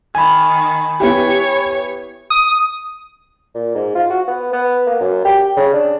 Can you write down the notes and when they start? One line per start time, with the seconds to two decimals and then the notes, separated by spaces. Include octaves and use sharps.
0.15 D#3 G#5 B5
1.00 B3 E4 G4 C#5
2.30 D#6
3.55 A#2
3.75 G#2
3.95 F4
4.10 F#4
4.28 B3
4.53 B3
4.87 A#3
5.00 F#2
5.25 G4
5.57 C#3
5.74 D4